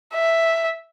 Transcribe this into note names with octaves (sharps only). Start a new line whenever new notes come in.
E5